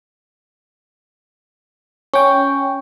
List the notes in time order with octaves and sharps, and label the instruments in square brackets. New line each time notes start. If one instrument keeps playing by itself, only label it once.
[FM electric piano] C#4 G5 [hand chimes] C#6